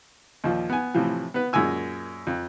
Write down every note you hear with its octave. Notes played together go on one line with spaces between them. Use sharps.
D#2 A#2 F3
B3 G#5
A2 C3 E3 F3
B3 B4
F#2 A#2 G#3 G#5 E6
F2